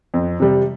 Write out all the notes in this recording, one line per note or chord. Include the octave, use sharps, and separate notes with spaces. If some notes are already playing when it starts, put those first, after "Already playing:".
F2
C3 G3